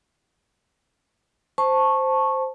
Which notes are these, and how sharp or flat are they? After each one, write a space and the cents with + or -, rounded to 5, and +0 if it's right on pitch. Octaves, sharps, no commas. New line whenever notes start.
C5 +0 A5 +0 C#6 -15